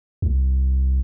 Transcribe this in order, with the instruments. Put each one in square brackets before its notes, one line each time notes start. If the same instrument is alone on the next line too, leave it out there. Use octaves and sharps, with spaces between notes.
[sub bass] C2